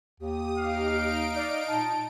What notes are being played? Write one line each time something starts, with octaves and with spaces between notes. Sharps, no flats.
D#2 G4 D#6
D#4 F5 D7
D5
A#2 A5